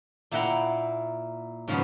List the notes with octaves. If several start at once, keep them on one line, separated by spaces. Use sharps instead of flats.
A#2 A#3 E4 F#5 G5 A#5
G#2 C#3 F3 B3